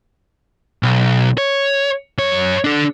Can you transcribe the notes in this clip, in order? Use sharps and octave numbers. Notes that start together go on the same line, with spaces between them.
B1
C#5
F#2 C#5
D4 A4